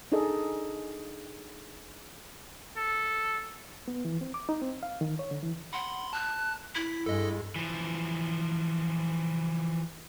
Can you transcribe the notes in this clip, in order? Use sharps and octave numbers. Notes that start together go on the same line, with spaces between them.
D4 D#4 G#4 A4 D#5
A4
B3
E3
C4
D6
D#4
C4
F5
D#3
C#5
D3
E3
F#5 B5 C6
A5 F#6
E4 B6
G2 G#3 A4 D#5
E3 F3